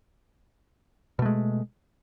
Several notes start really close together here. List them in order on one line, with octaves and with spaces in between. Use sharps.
B2 A3 G#3